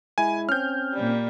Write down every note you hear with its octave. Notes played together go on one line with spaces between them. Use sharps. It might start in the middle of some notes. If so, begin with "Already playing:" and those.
G#3 E4 G#5
C4 C#4 F6 G6
A#2 G3